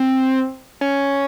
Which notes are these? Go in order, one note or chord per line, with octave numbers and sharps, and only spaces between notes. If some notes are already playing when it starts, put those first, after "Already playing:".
Already playing: C4
C#4